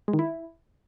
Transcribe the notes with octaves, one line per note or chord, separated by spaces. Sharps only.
G#3
D#3
E4